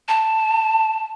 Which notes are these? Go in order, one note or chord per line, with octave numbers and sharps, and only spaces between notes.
A5